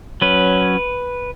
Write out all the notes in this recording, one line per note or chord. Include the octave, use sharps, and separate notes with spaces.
F#3 C#4 B4